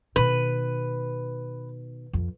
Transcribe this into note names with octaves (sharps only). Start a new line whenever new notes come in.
B2 D#3 B4
F2